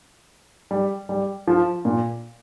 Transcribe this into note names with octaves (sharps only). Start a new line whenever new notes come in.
G3
G3
F3
A#2